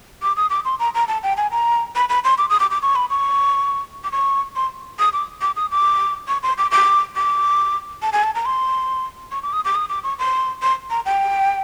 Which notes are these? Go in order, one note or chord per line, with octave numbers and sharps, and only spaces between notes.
D6
D#6
D6
C6
A#5
A#5
A5
G5
G#5
A#5
B5
B5
C6
D6
D#6
D6
D6
C#6
B5
C#6
D6
C#6
C6
D#6
D6
D6
D#6
D6
C#6
C6
D6
D6
D6
A5
G#5
A5
A#5
C6
C#6
D6
D#6
D6
D#6
D6
C#6
C6
C6
A#5
G5